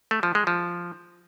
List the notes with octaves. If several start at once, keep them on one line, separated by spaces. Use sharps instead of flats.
A3
F3
G#3
F3